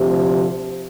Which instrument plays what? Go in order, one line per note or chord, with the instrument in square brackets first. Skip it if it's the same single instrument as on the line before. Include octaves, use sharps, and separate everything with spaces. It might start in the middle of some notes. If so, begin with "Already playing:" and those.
Already playing: [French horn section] D2 C3 F3 G4